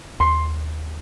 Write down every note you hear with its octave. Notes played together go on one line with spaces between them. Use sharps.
D#2 C6